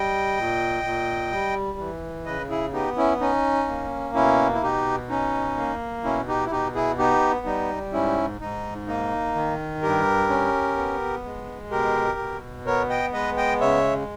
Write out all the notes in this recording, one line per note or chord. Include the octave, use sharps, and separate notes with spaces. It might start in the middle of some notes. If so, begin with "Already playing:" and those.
Already playing: G3 D#5 G5
A#2
A#2
G3
E3
C#3 B4 D#5
E4 G#4
B3 D#4 G4
C#4 E4
C#4 D#4
A#3
B2 C#4 E4
E4
B2 D#4 G4
C#4 D#4
A#3
B2 C#4 E4
D#4 G4
E4
B2 D#4 G4
E4 G#4
B3 D#4 G4
G3 D#4
G#2 C#4 E4
G#2 D#4
A#3 D#4
D#3
G2 G4 A#4
C#4
B3
G#3
B2 G4 A#4
B2
B3 A#4 C#5
D#5 G5
G#3 B4 D#5
D#5 G5
C#3 C#5 E5